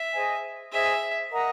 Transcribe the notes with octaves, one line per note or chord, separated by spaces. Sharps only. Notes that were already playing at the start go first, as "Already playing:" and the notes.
Already playing: E5
G#4 C5 D#5 G#5
G#4 C5 D#5 E5 G#5
A#4 D#5 F#5 A#5